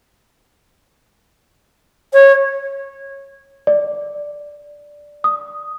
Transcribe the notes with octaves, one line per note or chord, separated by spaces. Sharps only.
C#5
D5
D#6